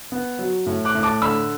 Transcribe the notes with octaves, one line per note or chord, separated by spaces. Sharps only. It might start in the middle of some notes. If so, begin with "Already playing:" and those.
B3
F#3
A2
D6 F#6
A2
A5 D6
D3 B5 E6